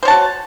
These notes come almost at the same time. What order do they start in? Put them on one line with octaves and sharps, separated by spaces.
C5 C#5 A5 F#4